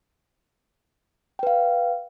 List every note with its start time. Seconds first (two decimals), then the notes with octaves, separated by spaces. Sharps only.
1.39 G5
1.43 B4
1.47 F5